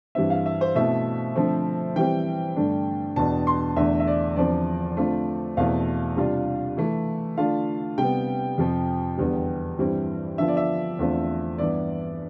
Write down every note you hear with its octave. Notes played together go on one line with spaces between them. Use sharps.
G2 E3 G3 C4 E5
F5
E5
C5
B2 A3 C4 E4 E5
D3 F3 A3 C4
E3 G3 C4 G5
G2 D3 A3 D4
E2 B2 B3 D4 A5
C6
E2 D3 A3 D4 E5
E5
D5
E2 D3 F3 C4 D5
D3 A3 C4 F4
E2 B2 A3 C4 E4 F5
C3 G3 D4 F4
E3 A3 E4
D3 A3 D4 F4 F5
C3 G3 B3 G5
F2 C3 F3
E2 D3 G3 B3
G2 E3 G3 C4 E4
D3 F3 B3 F4 E5
D5
E5
E2 D3 A3 C4 F4
G2 E3 B3 E4 D5